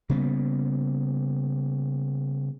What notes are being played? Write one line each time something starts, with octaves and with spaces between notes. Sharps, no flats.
C#3 G3 A#3 B3